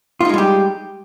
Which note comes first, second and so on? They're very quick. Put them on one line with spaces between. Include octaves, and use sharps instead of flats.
F4 D#4 G#3 G3 G4